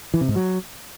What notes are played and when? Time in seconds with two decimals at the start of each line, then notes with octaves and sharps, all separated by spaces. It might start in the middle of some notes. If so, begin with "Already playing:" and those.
0.14 E3
0.21 C3
0.28 G#2
0.36 F#3